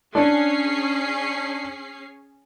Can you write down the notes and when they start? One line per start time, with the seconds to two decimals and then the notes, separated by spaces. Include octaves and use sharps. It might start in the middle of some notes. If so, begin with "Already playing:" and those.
0.15 C#4 D4 G#4 C7